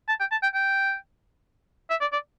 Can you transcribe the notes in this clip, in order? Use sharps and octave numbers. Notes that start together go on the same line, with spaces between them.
A5
G5
A5
G5
G5
E5
D5
D5